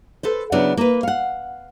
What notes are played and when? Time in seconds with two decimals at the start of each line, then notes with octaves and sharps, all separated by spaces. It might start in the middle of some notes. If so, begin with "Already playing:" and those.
0.23 A4 B4 C5
0.52 C#3 F#3 B3 D4 E4
0.77 A#3 B4
1.03 F5 F#5